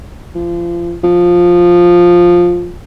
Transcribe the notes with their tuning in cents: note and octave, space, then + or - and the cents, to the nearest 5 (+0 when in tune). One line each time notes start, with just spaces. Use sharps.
F3 -30
F3 +5